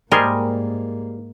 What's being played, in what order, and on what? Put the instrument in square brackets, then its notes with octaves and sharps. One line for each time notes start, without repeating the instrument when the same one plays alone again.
[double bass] G#2 A#3 [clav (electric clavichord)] G3 G#4 C5 [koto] A#4 D#5